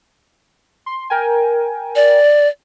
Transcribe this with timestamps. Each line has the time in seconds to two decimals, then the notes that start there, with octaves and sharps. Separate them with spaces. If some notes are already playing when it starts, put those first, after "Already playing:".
0.86 C6
1.10 A#4 G5 G#5
1.96 D5